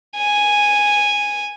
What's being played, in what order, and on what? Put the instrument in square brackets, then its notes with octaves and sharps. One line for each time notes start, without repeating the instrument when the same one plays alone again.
[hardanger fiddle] G#5